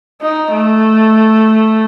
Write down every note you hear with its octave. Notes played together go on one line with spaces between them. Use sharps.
D#4
A3